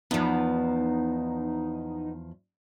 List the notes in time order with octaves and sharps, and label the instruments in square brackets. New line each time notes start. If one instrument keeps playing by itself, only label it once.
[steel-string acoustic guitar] E2 F3 [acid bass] B3 [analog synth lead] D#4